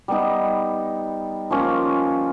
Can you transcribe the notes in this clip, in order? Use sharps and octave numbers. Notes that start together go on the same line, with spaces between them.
G3 B3 D#4
F3 A#3 C#4 F4